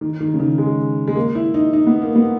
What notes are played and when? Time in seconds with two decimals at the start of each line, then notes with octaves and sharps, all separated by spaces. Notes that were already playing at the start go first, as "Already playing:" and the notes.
0.01 D#3
0.20 D#3
0.34 C#3
0.39 D#3
0.58 G#3
1.08 G#3
1.16 A#3
1.35 E4
1.54 D#4
1.73 D#4
1.87 B3
2.02 A#3
2.15 B3